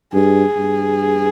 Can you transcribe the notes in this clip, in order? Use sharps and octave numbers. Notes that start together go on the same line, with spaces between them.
G2 G#4
G2